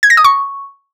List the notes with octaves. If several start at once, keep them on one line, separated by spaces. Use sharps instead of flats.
G#6
A#6
D#6
C#6